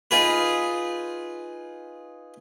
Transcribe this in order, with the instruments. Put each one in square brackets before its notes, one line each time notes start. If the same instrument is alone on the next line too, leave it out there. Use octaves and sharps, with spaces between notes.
[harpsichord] D#4 F4 G#4 B4